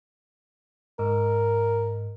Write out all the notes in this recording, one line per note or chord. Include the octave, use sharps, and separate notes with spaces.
G#2 A#4